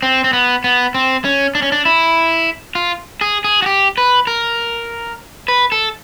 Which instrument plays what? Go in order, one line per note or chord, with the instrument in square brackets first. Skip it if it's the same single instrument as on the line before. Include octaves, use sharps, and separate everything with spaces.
[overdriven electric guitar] C4
C4
B3
B3
C4
C#4
D4
C#4
D4
E4
F4
G#4
G#4
F#4
G4
B4
A#4
B4
A4